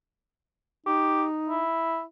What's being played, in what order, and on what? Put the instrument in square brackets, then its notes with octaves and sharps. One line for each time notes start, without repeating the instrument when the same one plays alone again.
[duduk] D#4 [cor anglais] G4
[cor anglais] E4